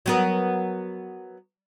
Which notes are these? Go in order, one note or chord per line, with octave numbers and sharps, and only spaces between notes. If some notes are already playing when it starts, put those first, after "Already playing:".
F#3 B3 A#4